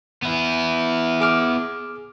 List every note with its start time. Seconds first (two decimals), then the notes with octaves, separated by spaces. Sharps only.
0.22 B3 E4
1.21 G#4 D6 F6